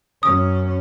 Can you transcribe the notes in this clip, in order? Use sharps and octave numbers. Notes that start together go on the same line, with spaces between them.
F#2 C#4 D#6